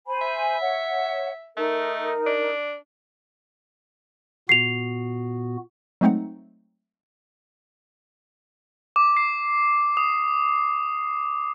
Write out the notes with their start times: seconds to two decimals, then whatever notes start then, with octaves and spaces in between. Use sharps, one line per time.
0.07 C5 G#5 B5
0.21 E5
0.60 C#5 F#5
1.57 A3 D#4 A#4
2.26 D4
4.49 A#2 B3 F#4 C7 F7
6.01 F#3 G#3 A3 C4 D#4 F#5
8.96 D6
9.17 C7
9.97 D#6